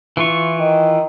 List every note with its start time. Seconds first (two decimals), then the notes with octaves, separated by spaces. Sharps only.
0.17 E3 E4 F4 C#6
0.59 D#3